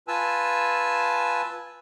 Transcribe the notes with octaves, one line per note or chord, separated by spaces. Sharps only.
F4 B4 G#5 A5 E6